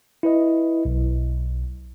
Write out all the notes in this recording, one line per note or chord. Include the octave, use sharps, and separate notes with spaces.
E4 B4 D#5
B1